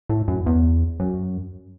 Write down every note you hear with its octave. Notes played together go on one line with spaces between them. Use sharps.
A2
F#2
E2
F#2